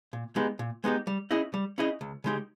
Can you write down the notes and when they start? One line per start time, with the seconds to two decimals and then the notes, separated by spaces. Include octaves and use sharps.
0.13 A#2
0.36 G#3 B3 D#4 G4
0.59 A#2
0.84 G#3 B3 D#4 G4
1.07 G3
1.31 C#4 E4 G#4 D#5
1.54 G3
1.78 C#4 E4 G#4 D#5
2.01 C#2
2.24 C#3 G#3 D#4 G4